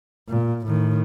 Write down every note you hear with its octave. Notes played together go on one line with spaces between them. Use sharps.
A#2
A2 D#3